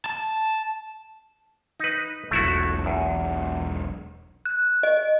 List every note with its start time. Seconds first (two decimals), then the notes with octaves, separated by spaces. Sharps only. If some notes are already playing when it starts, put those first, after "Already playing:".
0.06 A5
1.80 D#4 B4
2.31 E1 B1 A3 E4 F#4
2.86 E2
4.45 F#6
4.83 D#5